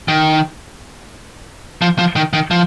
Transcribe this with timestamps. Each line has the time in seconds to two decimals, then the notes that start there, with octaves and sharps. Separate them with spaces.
0.08 D#3
1.82 F3
1.99 F3
2.16 D#3
2.33 D#3
2.51 F3